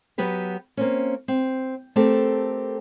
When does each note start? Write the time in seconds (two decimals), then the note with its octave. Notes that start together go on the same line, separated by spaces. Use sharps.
0.18 F#3 B3 F#4 G4 B4
0.77 A#3 C4 C#4
1.28 C4
1.96 A3 C4 G4 A4 A#4